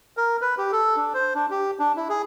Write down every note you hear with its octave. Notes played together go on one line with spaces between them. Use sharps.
A#4
B4
G4
A4
D4
C5
D4
G4
D4
E4
G#4